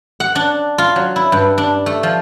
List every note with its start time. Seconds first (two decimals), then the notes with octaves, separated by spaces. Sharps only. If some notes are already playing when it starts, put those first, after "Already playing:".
0.20 F#5
0.35 D4
0.78 F4
0.96 F#3
1.16 E4
1.32 G2
1.58 D4
1.86 A3
2.03 F3